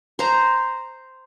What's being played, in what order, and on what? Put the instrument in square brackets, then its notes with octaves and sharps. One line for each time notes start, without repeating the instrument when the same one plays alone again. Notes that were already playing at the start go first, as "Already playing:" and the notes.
[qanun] C5 A#5